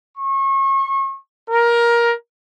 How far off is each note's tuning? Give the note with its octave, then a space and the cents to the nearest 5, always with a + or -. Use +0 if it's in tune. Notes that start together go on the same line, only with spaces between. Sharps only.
C#6 -35
A#4 +15